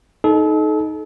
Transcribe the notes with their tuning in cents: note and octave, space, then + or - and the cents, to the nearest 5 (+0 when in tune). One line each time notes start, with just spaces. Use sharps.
D#4 +5 A4 -35